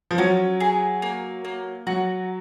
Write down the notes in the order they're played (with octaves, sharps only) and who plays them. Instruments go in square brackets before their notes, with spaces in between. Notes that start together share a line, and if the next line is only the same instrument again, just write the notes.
[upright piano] F3
[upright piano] F#3 [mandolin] C#4
[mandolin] G#4
A#3
A#3
[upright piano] F#3 [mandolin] F#4